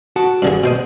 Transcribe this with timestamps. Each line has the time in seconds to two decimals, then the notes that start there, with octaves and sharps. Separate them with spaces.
0.16 F#4 F#5 A5
0.42 G2 D3 G#4
0.64 B2 C5 D#6